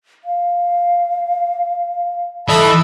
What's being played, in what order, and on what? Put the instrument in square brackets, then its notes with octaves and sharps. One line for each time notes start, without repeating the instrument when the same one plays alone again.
[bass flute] F5
[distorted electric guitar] E3 [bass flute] A4 [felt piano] D#5 [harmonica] E5 A5 B5